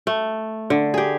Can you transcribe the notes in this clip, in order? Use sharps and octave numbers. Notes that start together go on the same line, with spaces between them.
A3
D3
G4 G#4